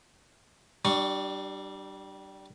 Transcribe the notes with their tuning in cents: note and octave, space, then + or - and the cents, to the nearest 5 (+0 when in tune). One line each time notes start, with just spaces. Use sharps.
G3 -20 D4 +25 C#6 +0